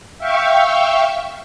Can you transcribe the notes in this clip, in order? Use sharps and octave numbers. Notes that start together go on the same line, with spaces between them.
E5 F5 G5 C#6